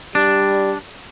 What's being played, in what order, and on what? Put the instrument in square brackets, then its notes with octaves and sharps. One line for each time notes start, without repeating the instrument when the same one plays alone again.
[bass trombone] G3 [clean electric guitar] D4